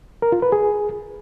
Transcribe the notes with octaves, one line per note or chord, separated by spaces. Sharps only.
A#4
F4
B4
G#4